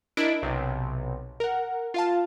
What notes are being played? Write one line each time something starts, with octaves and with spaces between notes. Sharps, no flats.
D4 E4 A#4 D#5 D7
B1 C3
A#4 F#5
F4 F5 A5